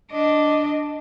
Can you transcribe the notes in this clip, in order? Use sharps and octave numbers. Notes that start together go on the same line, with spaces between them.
D4 D#5